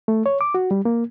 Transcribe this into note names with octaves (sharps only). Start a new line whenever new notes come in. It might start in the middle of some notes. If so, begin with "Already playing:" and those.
A3
C#5
D6
F#4
G3
A#3